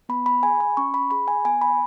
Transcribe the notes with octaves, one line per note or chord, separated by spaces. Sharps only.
B3 B5
B5
G#4 G#5
B5
C#4 C#6
B5
G#4 B5
G#5
B3 G#5
B5